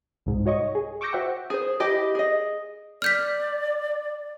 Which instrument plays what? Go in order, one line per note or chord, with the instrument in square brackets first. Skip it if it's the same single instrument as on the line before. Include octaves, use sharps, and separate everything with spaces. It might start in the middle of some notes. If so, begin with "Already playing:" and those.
[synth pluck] C2 G#2
F#4 C#5 D#5 C#6
G#4
C#6 D6 E6 G6 A#6 C#7
F#4 C5 E5 F#5 G5 C6
[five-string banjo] G#4 C5
E4 G4 D#5
G#4 D#5
[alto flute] D5 [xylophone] F6 G6 B6